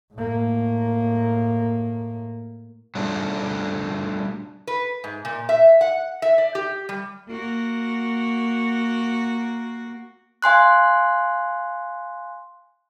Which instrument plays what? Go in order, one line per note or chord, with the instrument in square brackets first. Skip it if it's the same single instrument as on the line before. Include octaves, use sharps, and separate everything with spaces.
[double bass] A2 A#3
[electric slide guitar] F#3 G3 A3 D4 F4 F#4
[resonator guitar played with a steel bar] B4
G#2
A#2
E5
F#5
E5
D5
G4
G3
[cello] A#3 F#4
[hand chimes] F5 G#5 C6 F#6